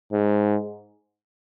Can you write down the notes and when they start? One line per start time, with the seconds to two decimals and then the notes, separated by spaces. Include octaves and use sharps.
0.13 G#2